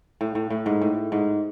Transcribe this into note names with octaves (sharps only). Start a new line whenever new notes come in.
A2
A2
A2
G#2
A2
G#2